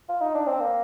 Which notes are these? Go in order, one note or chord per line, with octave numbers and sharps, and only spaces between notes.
F4
D#4
D4
C4
A#3